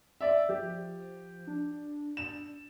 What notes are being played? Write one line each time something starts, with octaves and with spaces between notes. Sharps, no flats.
D5 E5
F3 G4
D4
E7